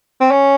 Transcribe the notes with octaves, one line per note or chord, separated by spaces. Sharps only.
C4
C#4